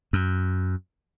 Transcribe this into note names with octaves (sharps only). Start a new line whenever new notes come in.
F#2